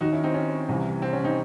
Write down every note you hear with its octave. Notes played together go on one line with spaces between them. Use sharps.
D#2 D#3 D#4 F#4
C#4 E4
C4 D#4
C#4
C2 C3 E3
C4
C#4
C4 D#4